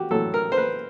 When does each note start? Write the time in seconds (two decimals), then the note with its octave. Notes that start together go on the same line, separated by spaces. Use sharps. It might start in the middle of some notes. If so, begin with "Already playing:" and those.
Already playing: F#4 G4
0.11 A2 F#3 A4
0.34 A#4
0.52 C5
0.58 B4